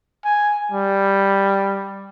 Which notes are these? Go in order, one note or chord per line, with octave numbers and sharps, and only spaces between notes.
G#5
G3